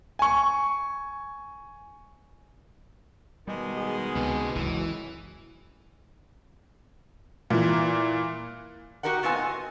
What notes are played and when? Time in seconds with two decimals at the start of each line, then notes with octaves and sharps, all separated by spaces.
0.19 G#5 C#6
3.47 B2 D#3 G3 G#3
3.77 G#4
4.15 C#2 C3 B3
4.55 F#1 C#2 E3
7.50 A#2 E3
9.03 F#4 G4 A#4 D#5 F#5
9.23 A2 B3 C4 F4 G#5
9.35 D#5